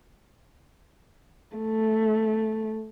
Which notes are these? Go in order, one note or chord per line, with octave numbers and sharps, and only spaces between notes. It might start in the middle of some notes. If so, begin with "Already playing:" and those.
A3